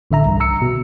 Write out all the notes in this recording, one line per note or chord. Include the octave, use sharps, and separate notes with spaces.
A1 D3 E5 A#5
C2 G2
A#5 E6 C#7
B2